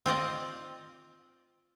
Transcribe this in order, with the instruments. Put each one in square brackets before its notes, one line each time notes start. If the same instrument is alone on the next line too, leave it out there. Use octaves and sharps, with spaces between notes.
[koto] C4 F4 D5 D#5